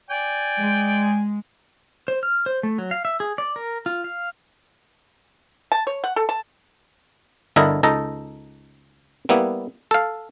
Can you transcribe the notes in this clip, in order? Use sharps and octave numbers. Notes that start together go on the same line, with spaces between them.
D5 G5 G#5
G#3
C5
F6
C5
A3
F#3
F5
E5
G#4
D5
A#4
F4
F5
A5
C#5
F#5
A4
A5
G1 D3 E4 A4 A#4 D#5
C#2 D#4 A4 A#5
G3 A#3 B3 E4
A4 F5